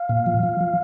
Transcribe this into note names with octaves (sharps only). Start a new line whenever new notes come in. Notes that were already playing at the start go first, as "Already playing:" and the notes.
Already playing: F5
A#2
F3
F3
F3